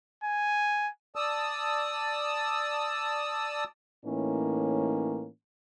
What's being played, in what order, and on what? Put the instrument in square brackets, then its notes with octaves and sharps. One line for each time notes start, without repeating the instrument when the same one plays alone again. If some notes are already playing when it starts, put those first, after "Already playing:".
[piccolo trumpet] G#5
[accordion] D5 A5 D#6 E6
[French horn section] A2 E3 A#3 C#4 D#4